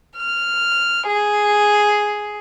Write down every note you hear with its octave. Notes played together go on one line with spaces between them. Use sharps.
F6
G#4